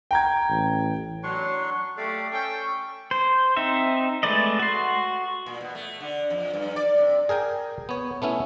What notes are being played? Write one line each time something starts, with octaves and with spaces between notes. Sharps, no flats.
G5 A#5 G#6
A1
F#3 D4 C6 C#6
A3 G4 D5 F5
C#4 A4 G5 C#6
C5
C4 D#4 E5
G#3 A3 B4 D5 D#5
F#4 C6
A#2
B2
A3
D3
F2
G2
D5
C3
G#4 A#4 G5 G#5
B3 C#5
A3 B3 C#4 E4